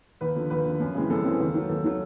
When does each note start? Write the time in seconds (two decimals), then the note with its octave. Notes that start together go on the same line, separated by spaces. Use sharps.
0.21 D#2 B4
0.35 D3 F3
0.50 D#2 B4
0.65 D3 F3
0.80 F#2
0.95 C#3 E3 G#3 C4
1.10 F#2 A4
1.25 C#3 E3 G#3 C4
1.40 D#2
1.54 D#3 F#3
1.69 D#2 A4
1.84 D#3 F#3